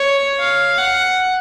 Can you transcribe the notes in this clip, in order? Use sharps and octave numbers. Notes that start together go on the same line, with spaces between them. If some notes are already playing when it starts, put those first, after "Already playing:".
Already playing: C#5
F5
F#5